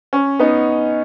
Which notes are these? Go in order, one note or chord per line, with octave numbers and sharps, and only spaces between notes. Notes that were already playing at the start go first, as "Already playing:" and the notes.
C#4
B3 D#4